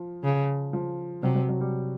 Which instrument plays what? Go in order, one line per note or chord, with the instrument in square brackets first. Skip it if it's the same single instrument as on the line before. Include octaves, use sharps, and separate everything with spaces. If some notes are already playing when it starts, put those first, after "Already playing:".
Already playing: [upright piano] F3
[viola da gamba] C#3
[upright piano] F3
[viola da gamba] C3 [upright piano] F#3
[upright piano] F#3
F#3
G3